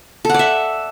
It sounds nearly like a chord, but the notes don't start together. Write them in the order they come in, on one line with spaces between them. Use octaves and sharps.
A4 F#5 D5 E5